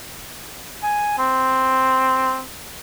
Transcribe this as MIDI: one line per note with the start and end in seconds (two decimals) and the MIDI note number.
0.83 1.16 80
1.18 2.42 60